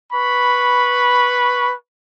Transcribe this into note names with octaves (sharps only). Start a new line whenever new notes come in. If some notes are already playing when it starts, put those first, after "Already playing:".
B4 B5 C#6